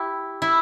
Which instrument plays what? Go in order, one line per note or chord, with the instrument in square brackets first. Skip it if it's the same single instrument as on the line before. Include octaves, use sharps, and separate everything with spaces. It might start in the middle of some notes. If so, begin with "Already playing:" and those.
Already playing: [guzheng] E4 G4
E4